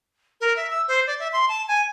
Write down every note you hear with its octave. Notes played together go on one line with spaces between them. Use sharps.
A#4
E5
E6
C5
D5
E5
C6
A5
G#5